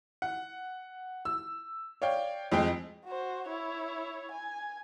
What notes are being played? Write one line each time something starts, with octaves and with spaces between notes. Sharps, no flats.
F#5
E6
C#5 D5 F5 G5
F2 G#3 G5
F#4 C5
E4 C#5
G#5